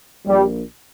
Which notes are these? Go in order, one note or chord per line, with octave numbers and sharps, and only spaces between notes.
A#1 A#2 G3